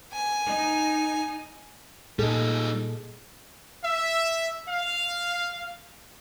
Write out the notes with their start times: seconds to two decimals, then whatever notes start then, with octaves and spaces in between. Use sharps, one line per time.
0.13 G#5
0.45 D#4
2.19 A#2 G3 D#4 G#4 A4
3.84 E5
4.68 F5